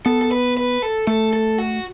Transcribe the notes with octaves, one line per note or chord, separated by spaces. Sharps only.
B3 A4
A4
B4
B4
A4
A3 A4
A4
F#4